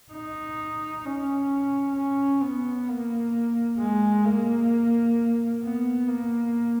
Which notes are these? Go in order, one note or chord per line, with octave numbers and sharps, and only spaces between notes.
D#4
C#4
C#4
B3
A#3
G#3
A#3
B3
A#3